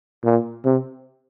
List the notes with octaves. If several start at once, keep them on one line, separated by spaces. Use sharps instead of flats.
A#2
C3